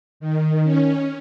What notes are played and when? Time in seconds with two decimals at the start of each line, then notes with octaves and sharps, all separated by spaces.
0.20 D#3
0.64 C#4